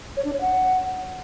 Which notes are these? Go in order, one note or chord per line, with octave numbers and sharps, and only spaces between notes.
C#5
D4
C#5
F#5